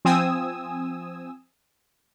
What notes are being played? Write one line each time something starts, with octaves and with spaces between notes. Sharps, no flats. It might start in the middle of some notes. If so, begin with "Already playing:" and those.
F3 C4 G#5 D#6 E6